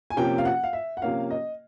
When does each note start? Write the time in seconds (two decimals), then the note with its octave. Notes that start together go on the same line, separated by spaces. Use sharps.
0.10 G#5
0.16 C3 F3 A#3 C#4 G5
0.38 F5
0.45 F#5
0.64 F5
0.73 E5
0.97 F#5
1.02 C3 F3 A#3 C#4 F5
1.31 D#5